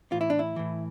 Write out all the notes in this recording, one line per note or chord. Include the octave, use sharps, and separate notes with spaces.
A2 E3 F4
E4
D4
E4
A2 E3